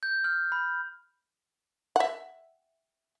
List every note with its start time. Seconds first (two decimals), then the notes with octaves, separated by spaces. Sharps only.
0.03 G6
0.24 F6
0.52 B5
1.96 E5 F#5